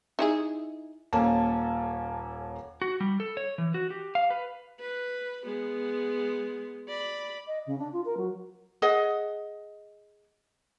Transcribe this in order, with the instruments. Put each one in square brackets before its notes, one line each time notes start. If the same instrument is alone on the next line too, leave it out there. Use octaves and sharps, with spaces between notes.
[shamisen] D#4 E4 G#4
[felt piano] D#1 A#3 C#4 A4 A5
[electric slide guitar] F#4
G3
A4
C#5
E3
F#4
G4
F5
B4
[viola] B4
G#3 B3
D5 B5
[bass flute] D#5
C#3
D4
F4
A#4
F#3
[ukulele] G#4 D#5 F#5